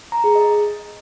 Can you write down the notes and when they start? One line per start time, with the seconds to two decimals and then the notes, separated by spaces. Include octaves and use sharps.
0.12 A#5
0.24 G#4
0.35 D#5